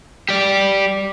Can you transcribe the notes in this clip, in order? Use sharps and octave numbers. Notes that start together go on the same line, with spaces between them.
G4 D5